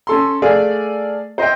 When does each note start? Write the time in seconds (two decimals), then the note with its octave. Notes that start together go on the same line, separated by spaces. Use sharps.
0.07 C#4 A4 C6
0.42 A3 G#4 A4 D5 F5 G#5
1.38 C5 D#5 E5 G5